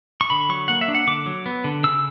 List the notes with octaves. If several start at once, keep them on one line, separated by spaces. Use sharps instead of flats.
C#6
D3 B5
F#3 C#6
A#3 F#5
E5
D4
F#5
D3 D6
F#3
B3
D3
C#3 E6